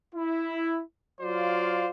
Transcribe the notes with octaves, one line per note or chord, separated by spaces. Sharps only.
E4
F#3 F4 C5 D5 F5